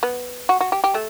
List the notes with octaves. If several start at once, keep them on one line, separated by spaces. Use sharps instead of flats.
B3
F#4
F#4
G4
G4
A3